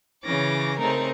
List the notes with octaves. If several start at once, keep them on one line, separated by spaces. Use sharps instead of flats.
C#3 E3 C#4 D6 A#6
C#3 A3 C4 D#4 A#4